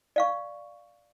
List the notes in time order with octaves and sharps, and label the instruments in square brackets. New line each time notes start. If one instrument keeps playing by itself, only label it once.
[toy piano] D5 F5 C#6